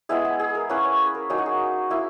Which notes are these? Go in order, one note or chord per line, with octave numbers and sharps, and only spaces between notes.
G#3 B3 E4 G#4
G#4
G#4
A#4
A#3 C#4 E4 B4
C#5
B4
A#4
F#3 A#3 D#4 G#4
F#4
G#4
A#3 E4